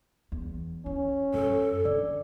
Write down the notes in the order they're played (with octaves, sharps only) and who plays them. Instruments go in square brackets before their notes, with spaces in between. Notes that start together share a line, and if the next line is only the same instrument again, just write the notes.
[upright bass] E2
[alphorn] C#4 [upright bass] E4
[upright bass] F#2 [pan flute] A4
[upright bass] D3 [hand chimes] D5